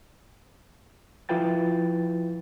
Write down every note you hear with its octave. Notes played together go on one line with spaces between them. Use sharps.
F3 E4 F4 B4 G5 A6